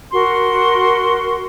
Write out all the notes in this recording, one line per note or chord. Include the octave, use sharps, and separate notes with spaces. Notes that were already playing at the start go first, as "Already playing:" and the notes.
F#4 A#4 C6